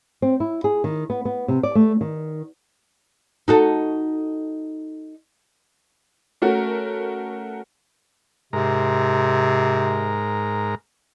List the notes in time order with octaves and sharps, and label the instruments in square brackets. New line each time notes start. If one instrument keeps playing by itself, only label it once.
[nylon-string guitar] C4
E4
G#4
D#3
B3
B3
C3
D5
A3
D#3
[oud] D#4 F#4 A4
[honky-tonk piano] A3 C#4 F#4 A#4
[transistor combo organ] G#2 A#4 [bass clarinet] C3